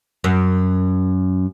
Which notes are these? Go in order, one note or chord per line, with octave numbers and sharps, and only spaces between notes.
F#2